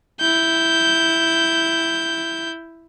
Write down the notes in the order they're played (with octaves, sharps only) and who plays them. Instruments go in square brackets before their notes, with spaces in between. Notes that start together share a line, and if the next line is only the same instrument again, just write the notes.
[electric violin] E4 G6